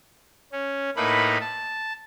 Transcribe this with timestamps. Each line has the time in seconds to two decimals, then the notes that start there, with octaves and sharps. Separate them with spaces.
0.52 C#4
0.96 A2 A3 A#3 D#4 B4 B5
1.41 A5